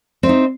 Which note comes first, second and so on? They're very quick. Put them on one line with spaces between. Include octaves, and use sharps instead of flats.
C4 E5 D#4